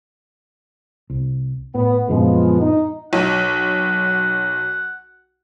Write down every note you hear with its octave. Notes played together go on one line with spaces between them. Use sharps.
C2
A2 B3
F#2 A#2 D3 F3 G#3 B3
D#4
B1 F#5